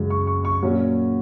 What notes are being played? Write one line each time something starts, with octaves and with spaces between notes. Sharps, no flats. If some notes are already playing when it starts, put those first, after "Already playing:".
Already playing: F#2 C#3 G#3
C#6
C#6
C#6
A#2 F#3 A#3 C#4